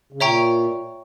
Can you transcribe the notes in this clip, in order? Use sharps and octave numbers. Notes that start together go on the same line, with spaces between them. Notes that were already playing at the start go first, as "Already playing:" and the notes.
C#3
A#2 C#5 E5 G5 A#5 C#6